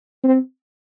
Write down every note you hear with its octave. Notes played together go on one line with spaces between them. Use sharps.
C4